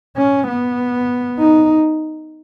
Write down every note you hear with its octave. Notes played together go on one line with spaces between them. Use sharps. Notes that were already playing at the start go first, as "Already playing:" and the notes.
C#4
B3
D#4